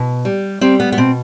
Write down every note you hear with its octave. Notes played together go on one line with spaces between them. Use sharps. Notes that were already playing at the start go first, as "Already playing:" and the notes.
Already playing: B2
G3
G3 C4
B3
B3
B2 C4